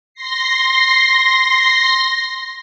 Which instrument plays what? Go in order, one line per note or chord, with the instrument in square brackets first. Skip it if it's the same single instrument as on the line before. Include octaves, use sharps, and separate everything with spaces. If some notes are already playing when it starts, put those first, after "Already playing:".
[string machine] C6 A#6 C7